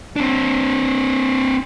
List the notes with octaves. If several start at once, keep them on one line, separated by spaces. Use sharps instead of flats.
C4 D4